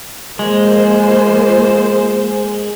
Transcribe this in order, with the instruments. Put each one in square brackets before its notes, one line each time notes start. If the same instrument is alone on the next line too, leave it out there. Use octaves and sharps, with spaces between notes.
[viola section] F3 A#3 C5 [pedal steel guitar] G#3